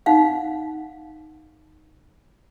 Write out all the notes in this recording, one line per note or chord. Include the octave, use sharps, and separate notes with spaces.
D#4 F5 F#5